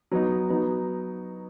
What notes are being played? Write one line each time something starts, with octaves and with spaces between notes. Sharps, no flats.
F#3 B3 D#4
F#3 B3 D#4